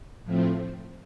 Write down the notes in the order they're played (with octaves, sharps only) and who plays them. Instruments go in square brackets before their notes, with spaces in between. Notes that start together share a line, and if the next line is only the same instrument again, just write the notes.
[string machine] A2 F3 A3 C4